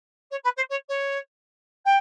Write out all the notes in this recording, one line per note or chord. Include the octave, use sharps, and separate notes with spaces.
C#5
B4
C5
C#5
C#5
G5